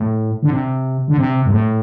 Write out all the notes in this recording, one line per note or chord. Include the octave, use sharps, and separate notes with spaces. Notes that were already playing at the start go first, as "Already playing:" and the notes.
Already playing: A2
D3
C3
D3
C3
G2
A2